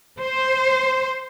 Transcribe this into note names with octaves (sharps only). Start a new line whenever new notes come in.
C5